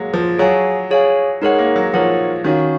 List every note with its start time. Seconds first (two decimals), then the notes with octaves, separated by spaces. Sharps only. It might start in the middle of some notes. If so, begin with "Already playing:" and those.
Already playing: F#3 G#3 A#3
0.14 F3
0.38 F#3 G#4 C#5 F5 G#5
0.91 G#4 C#5 F5 G#5
1.42 G#3 D#4 A#4 C#5 F#5
1.59 A#3
1.76 F#3
1.94 F3 D#4 A#4 C#5 F#5
2.44 D#3 C#4 F#4 C#5 F5